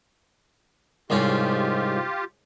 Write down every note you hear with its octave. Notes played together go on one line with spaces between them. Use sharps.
C2 G#2 C#4 F4 G4